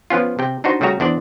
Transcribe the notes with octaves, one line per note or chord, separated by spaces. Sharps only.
F3 B3 C#4 F4
C3 G5
D4 D#4 F#4 C5
C#3 G3 A3 F#4 A#5
E2 D4 C5 D5